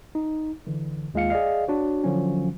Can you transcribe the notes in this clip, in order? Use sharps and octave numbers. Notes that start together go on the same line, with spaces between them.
D#4
D3 E3
D#2 G#3 F4 F5 C#7
G#4 D5 D#5 F5
D4 F#4 C#5
D3 F3 F#3 C#4